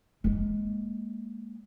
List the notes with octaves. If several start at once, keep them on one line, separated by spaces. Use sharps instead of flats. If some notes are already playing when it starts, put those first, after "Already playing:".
G#3 A#3